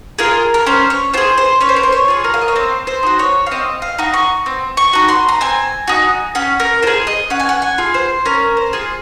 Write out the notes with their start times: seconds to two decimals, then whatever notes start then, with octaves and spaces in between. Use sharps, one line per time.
0.19 F4 G#4 A#4
0.54 A#4
0.66 C#4 C5
0.90 C#5
1.13 F4 C5
1.18 G#4
1.38 C5
1.61 C#4 C#5
1.69 C5
1.76 A#4
1.83 C5
1.92 C#5
2.08 F4 G#4
2.24 A#4
2.34 F5
2.42 D#5
2.48 C#5
2.56 C4 C5
2.87 C5
3.03 D#4 F#4
3.19 C#5
3.46 F5
3.51 C4 D#5
3.82 F5
3.99 D#4 F#4
4.14 C#6
4.46 C4
4.77 C#6
4.93 D#4 F#4
5.09 C6
5.29 A#5
5.41 C4 G#5
5.88 D#4 F#4
6.35 C#4 F#5
6.60 A#4
6.82 F4 C5
6.87 G#4
7.07 D#5
7.30 C#4 F#5
7.40 G#5
7.49 F#5
7.62 G#5
7.78 F4 G#4
7.94 C5
8.25 C#4 A#4
8.57 C5
8.73 F4 G#4